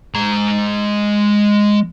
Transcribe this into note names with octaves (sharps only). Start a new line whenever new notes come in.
G#3 A#5